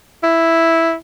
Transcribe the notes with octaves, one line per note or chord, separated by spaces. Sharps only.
E4